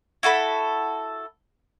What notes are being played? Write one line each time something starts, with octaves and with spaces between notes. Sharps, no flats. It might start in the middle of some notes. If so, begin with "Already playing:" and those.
E4 F#4 A4 B5